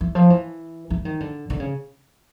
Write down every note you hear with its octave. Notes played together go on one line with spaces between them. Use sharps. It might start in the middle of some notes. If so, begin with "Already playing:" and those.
E3
F3
E3
E3
D#3
D3
D3
C#3